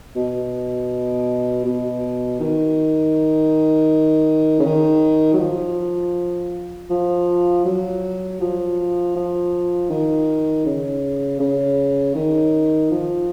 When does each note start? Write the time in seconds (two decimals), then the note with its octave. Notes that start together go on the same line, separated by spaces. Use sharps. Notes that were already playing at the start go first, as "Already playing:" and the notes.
0.16 B2
1.65 B2
2.40 D#3
4.59 C#3
4.65 D#3
5.33 F#3
5.40 F3
6.90 F3
7.65 F#3
8.41 F3
9.16 F3
9.90 D#3
10.66 C#3
11.40 C#3
12.15 D#3
12.91 F3